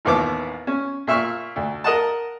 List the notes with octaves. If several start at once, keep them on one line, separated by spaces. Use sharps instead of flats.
A1 D#2 B3 D6
C#4
A#2 E5 C#6 F6
D2
A#4 D#5 F#5 A5